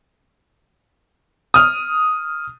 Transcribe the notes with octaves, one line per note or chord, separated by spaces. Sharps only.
D#6 F6